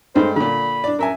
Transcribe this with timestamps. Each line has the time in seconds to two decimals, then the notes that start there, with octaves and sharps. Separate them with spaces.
0.15 G2 G#3 A3 C5
0.36 A#2 D3 B5
0.84 D4 D5
0.99 F#2 A#4 E5 G#5